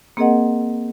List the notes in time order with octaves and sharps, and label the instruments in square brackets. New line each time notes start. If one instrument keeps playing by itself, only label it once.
[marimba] A#3 C4 G#4 A#4 D#5 F#5